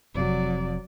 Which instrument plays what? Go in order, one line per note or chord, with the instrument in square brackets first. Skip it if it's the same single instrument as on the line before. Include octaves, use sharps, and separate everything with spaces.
[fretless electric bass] F1 F2 C3 [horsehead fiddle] F#3 D5